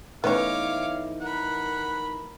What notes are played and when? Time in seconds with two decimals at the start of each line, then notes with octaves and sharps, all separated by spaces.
0.24 E3 A3 B3 C#4 D#4 C#5 F5 D6
1.21 A#4 F#5 B5